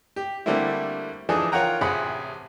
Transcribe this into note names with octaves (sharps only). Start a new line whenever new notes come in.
G4
D3 G3 A3 A#3 C4 E4
E3 F3 D4 D#4 G#4 A4
F4 A#4 C#5 F#5 G5 A#5
A1 C3 C4 G#4 F#5 B5